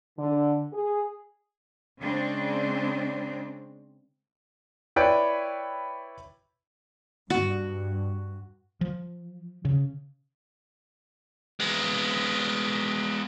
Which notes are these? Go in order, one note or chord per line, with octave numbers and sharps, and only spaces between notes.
D3
G#4
C#3 G#3 C4 D4
E4 B4 C#5 D5 G5
G2 F#4
F3
C#3
G#3 B3